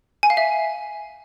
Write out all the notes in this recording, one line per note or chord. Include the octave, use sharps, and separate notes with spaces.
G#5
F5
E5